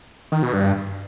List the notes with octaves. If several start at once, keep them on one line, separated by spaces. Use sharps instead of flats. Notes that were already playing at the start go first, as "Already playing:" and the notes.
D#3
B2
G2